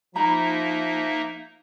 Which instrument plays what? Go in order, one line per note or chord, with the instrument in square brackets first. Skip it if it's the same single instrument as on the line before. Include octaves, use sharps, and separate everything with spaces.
[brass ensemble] F3 [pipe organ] A#3 D#4 E5 [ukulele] E4 A#5 B5